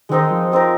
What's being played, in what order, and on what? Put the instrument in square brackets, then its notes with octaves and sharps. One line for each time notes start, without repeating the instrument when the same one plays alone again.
[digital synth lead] D#3 [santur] G#3 C4 D#4 A#4
[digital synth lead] F3
[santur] G#3 C4 D#4 A#4